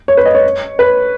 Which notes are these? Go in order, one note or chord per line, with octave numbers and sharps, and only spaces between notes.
C#5
B4
D#5
C#5
B4